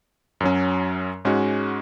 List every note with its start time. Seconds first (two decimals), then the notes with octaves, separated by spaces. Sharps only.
0.40 F#2 F#3 C#4
1.25 G#2 G#3 C#4 F#4